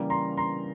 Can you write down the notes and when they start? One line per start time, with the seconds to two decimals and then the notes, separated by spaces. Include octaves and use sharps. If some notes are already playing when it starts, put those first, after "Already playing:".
Already playing: C#3 E3 G3 A#3
0.10 A#5 C6
0.37 A#5 C6